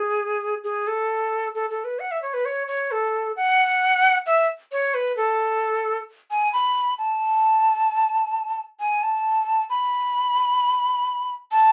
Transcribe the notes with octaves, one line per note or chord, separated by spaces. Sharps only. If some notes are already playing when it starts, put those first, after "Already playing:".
Already playing: G#4
G#4
A4
A4
A4
B4
F#5
E5
C#5
B4
C#5
C#5
A4
F#5
E5
C#5
B4
A4
G#5
B5
A5
G#5
A5
B5
A5